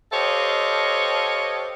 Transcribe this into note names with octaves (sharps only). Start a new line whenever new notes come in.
G4 A4 C5 C#5 D#5 F5